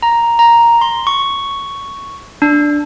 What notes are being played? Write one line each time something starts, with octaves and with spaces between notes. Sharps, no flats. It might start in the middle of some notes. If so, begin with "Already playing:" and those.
A#5
A#5
C6
C#6
D4